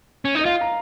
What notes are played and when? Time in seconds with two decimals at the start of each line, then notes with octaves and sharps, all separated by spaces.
0.25 C#4
0.35 D#4 D#5
0.45 F4 F5
0.61 A#5